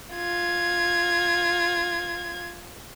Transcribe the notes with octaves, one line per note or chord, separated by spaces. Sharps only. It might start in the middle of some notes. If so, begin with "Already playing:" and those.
F4 G#6